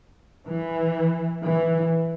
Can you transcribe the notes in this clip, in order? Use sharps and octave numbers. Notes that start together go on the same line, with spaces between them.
E3
E3